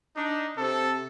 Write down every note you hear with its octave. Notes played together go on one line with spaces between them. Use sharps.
D4 D#4
C3 A4